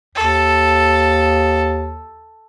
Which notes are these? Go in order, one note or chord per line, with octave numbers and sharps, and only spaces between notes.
D#2 A4